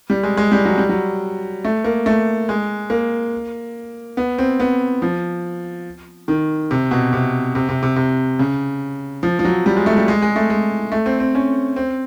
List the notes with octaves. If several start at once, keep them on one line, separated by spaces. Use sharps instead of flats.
G3
G#3
G#3
G3
F#3
G3
F#3
A3
A#3
A3
G#3
A#3
B3
C4
B3
F3
D#3
C3
B2
C3
C3
C3
C3
C3
C#3
F3
F3
F#3
G3
G#3
A3
G3
G#3
G#3
A3
G#3
A3
C4
C4
C#4
C4